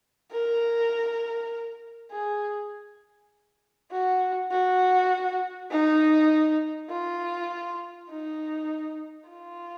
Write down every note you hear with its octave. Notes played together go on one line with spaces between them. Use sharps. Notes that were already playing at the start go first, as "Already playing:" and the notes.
A#4
G#4
F#4
F#4
D#4
F4
D#4
F4